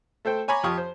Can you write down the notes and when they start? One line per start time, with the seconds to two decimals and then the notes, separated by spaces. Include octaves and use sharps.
0.25 A3 A4 C5 G5
0.48 C#5 G#5 A#5 B5 C#6 D6
0.63 F2 F4 G4 C#6 D#6 F6
0.78 C5